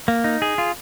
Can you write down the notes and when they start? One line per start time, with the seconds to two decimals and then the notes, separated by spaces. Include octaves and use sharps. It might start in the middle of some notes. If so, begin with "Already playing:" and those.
0.08 A#3
0.24 D#4
0.42 G#4
0.58 F4